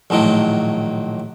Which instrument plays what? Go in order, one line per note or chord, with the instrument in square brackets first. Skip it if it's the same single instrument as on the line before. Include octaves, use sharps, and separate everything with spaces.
[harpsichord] A#1 A2 D#3 F#3